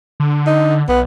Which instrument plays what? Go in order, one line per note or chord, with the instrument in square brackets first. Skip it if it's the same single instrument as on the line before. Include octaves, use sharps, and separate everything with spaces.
[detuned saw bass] D3
[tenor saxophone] D#4
[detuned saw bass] B1 [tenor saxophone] B3